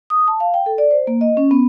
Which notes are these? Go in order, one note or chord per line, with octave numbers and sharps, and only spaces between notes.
D#6
A5
F5
G5
A4
D5
C5
A#3
D#5
C#4
B3